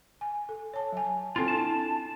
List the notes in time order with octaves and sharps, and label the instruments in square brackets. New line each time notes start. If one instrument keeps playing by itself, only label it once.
[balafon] G#5
A4
C#5 A5
F#3 G#5
[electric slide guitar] C4 F4 [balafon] A4 G#5 A5
[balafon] D4 E4 [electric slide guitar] A5